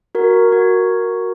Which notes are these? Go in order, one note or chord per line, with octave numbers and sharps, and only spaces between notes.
F#4 A#4
F#4